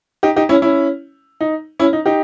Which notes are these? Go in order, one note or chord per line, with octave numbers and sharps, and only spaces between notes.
D#4 G4
D#4 G4
C#4 E4
C#4 E4
D#4
C#4 E4
D#4
D#4 G4